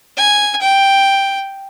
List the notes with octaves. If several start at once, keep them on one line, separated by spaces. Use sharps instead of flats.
G#5
G5